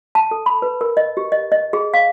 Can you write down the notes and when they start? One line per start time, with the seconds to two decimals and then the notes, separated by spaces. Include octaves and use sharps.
0.15 A5
0.31 A4
0.46 B5
0.62 B4
0.81 A#4
0.97 D#5
1.17 G4
1.32 D#5
1.52 D#5
1.73 G#4
1.94 F5